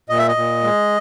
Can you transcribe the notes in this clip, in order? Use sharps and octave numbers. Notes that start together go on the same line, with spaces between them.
A#2 D#5
E5
D#5
A#2
G#3